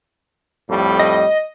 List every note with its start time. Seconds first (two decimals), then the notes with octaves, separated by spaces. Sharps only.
0.68 F2 A2 G3
0.99 D#5